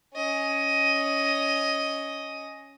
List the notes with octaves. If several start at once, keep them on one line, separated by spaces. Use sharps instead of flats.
C#4 D#5